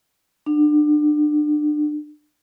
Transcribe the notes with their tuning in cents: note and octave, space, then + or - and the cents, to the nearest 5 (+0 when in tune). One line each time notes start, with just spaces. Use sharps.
D4 +30 F#5 +0